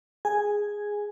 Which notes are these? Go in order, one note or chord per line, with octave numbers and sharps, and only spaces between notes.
G#4 G#5